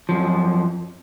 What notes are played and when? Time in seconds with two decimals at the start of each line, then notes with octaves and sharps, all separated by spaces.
0.09 F#2 F3